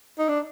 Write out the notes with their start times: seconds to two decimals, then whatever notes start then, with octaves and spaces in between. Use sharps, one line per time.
0.18 D#4
0.29 D4